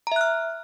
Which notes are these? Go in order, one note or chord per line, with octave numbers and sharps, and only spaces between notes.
E5 A#5 F6 F#6